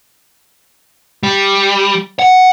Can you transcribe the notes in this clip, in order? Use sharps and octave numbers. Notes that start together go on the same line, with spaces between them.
G3
F#5